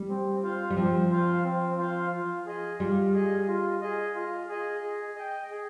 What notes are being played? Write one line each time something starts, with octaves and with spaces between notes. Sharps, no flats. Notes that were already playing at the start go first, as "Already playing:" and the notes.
Already playing: G3
C4
F4 C5 F5
G3
F3 C4
F4 C5 F5
C4
F4 C5 F5
F4
G#4 D#5
G3 F4
G#4 D#5
F4
G#4 D#5
F4
G#4 D#5
G#4
D#5 G5
G#4